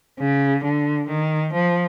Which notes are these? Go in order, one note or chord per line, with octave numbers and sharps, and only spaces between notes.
C#3
D3
D#3
F3